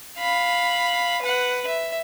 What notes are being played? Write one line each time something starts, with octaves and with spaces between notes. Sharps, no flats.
F5 B5
B4 F#5
E5